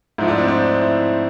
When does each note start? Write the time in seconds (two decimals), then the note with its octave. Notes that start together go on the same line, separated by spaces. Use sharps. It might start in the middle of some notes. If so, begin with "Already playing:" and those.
0.18 G#2 F3 A3 E4
0.28 D4
0.38 C4
0.48 D4
0.81 E4